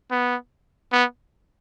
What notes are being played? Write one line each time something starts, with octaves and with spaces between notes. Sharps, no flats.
B3
B3